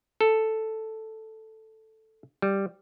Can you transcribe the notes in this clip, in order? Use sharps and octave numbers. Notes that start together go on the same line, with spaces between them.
A4
G3